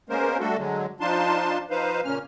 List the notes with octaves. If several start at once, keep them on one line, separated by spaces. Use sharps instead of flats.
G#3 A#3 B3 C#4 A#4 C5
G3 A3 D4 F#4 A4
D3 F#3 G#3
F3 D4 D#4 F4 A5 C6
F3 D#4 B4 C5 F5
A#2 C#3 A#3 C#4 F6